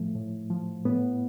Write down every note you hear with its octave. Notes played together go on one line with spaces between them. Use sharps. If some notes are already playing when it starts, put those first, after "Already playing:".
Already playing: A2 F3 A3
A2
F3
A2 B3